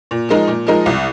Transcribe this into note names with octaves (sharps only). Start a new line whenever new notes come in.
A#2
F3 G#3 D#4 A#4
A#2
F3 G#3 D#4 A#4
C2